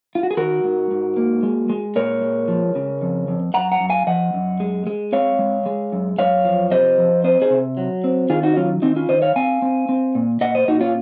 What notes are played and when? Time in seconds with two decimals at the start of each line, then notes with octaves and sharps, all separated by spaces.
0.15 F4
0.23 F#4
0.31 G#4
0.37 D#3 F#4 A#4
0.64 G#2
0.91 G#2
1.17 A#3
1.43 G#3
1.70 G#3
1.96 A#2 A#4 C#5
2.22 G#3
2.48 F3
2.75 C#3
3.02 F2
3.28 F2
3.54 F#2 F#5 A#5
3.72 F#5 A#5
3.80 F#2
3.90 F5 G#5
4.07 F3 D#5 F#5
4.34 F#2
4.60 G#3
4.87 G#3
5.12 C4 C#5 F5
5.39 G#3
5.66 G#3
5.92 F#2
6.18 F#2 C#5 F5
6.45 F3
6.71 C3 C5 D#5
6.98 F3
7.24 C4 C5 D#5
7.42 G#4 C5
7.50 C3
7.77 F#3
8.04 C4
8.30 D#3 F4 G#4
8.43 D#4 F#4
8.56 F#3 C#4 F4
8.82 D#3 C4 D#4
8.96 C#4 F4
9.09 D#3 C5 D#5
9.22 C#5 F5
9.36 C4 F5 G#5
9.62 C4
9.89 C4
10.15 A#2
10.41 A#2 D#5 F#5
10.55 C5 D#5
10.68 A#2 D#4 F#4
10.81 C#4 F4